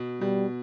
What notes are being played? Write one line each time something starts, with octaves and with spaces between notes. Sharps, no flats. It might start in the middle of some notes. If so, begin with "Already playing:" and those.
Already playing: B2
B2 G3